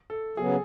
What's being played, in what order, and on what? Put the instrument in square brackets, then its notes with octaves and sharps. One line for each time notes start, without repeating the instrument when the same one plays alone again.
[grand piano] A4
[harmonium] C#3 F#3 B3 [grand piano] G#4